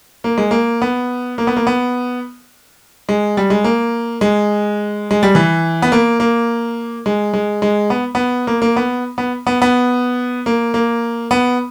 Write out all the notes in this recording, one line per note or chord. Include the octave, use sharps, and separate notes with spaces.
A#3
G#3
A#3
B3
A#3
B3
A#3
B3
G#3
G3
G#3
A#3
G#3
G#3
G3
E3
B3
A#3
A#3
G#3
G#3
G#3
B3
B3
A#3
A#3
B3
B3
B3
B3
A#3
A#3
B3